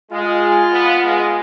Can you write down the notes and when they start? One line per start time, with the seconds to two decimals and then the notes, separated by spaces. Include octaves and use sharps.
0.11 G#3 F4
0.72 B3
1.04 G#3